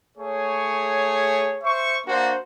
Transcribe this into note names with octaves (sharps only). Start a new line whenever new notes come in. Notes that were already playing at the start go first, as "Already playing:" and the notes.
A3 G#4 C#5
C5 E5 C#6
A#3 D4 F#4 C5